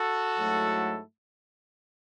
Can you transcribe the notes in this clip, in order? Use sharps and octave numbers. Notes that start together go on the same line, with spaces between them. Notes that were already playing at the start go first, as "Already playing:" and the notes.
Already playing: F#4 A4
G#2 F#3 A3 E4